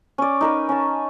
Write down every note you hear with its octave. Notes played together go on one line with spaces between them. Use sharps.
C#4 D5
D#4 A#4 B4
C#4 A5